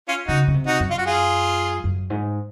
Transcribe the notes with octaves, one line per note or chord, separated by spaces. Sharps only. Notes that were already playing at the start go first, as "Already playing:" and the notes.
C#4 F4
C#3 D#4 F#4
C#3
C3
D#4 F#4
F#2
F4
F#4
F4 G#4
F#2
G#2